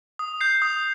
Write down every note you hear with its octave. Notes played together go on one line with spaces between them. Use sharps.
D#6
G6 C7
D#6